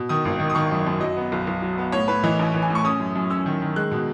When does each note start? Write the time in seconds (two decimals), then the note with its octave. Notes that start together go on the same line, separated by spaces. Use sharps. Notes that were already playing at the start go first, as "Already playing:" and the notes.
Already playing: B2
0.09 D#3 D#6
0.25 G#1
0.39 D#3
0.50 D#6
0.55 D#3 C#6
0.71 F#2
0.87 F#2
1.01 F#3 D#5
1.17 B3
1.32 B1
1.47 B1
1.62 F#3
1.78 B3
1.92 A2 C#5
2.08 A2 B4
2.23 E3 D#5
2.39 A1
2.54 E3
2.62 G#5
2.70 A2
2.75 C#6
2.85 C#4 D#6
3.00 F#2
3.16 F#2
3.30 C#4 E6
3.46 D#3
3.62 D#3
3.76 G#3 F#6
3.91 B2